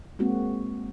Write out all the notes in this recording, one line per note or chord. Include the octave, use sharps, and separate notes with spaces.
G#3 A#3 C4 F#4